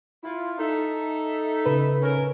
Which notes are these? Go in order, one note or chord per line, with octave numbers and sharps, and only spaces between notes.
E4 F4
D#4 A4 E5
C#3 B4
C#4 A#4